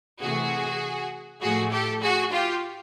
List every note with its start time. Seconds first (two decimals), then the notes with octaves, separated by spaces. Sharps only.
0.22 C3 E3 A3 F#4 G#4
1.42 A2 F3 A3 F#4 G#4
1.72 G4 A4
2.02 F#4 G#4
2.32 F4 G4